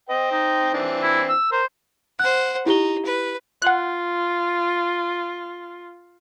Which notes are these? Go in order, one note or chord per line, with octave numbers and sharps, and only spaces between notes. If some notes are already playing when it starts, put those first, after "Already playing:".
C5 D#5 G5
D#4
E3 C4 D4
E4
E6
A#4 C5
C5 F#5 F#6
D#4 E4 G4 G7
B4
F4 F#5 F#6